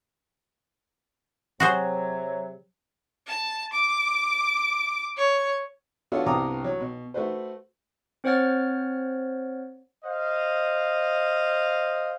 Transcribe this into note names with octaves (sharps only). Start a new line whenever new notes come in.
C3 F#3 F#4 G#4 C5
A5
D6
C#5
B3 D4 F4 F#4 A4 C#5
C2 G2 B3 A#5 D6 D#6
F#3
B2
A3 F#4 B4 C5
C4 C5 C#5 F#5 F6 A6
C5 D#5 F5